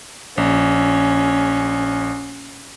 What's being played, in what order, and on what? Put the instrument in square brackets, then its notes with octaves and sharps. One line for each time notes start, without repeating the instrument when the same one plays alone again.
[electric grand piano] A#1 [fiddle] C#4